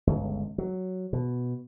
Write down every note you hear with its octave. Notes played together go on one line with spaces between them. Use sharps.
G1 C#2
F#3
B2